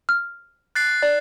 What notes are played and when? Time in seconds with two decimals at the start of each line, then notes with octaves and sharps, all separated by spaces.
0.09 F6
0.75 F#6 A6 C7
1.02 D5